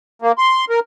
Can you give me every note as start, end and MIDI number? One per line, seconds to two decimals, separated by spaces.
0.22 0.32 58
0.38 0.65 84
0.70 0.80 70